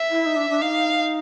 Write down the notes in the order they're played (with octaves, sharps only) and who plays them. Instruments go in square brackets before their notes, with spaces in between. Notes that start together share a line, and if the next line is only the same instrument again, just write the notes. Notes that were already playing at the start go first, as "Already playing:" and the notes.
Already playing: [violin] E5
[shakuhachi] E4
D#4
D4
D4
[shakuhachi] D#4 [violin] F5